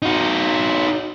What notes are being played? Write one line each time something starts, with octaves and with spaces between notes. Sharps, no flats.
D#4 F#4